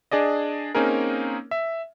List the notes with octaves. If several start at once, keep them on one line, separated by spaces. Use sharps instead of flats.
D4 G#4 D5 D#5
A#3 C4 C#4 D#4 G#4 A#4
E5